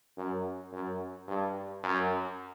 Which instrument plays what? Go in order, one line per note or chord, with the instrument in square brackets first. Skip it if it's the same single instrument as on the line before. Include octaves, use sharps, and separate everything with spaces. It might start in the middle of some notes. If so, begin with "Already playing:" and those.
[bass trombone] F#2
F#2
G2
F#2